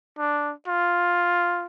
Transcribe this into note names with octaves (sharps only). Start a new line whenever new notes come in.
D4
F4